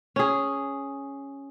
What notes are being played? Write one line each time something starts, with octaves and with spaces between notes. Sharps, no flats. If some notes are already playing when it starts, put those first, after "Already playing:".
C#4 G#4